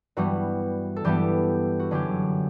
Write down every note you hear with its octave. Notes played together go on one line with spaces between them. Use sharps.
G2 E3 G3 B3 F#4
A4
G2 E3 G3 B3 G4
F#4
F#2 D3 F#3 C#4 G4